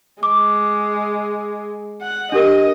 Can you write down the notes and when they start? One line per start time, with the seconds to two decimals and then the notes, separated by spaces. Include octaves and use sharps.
0.23 G#3 D6
2.02 F#5
2.32 D4 G4 A#4 D#5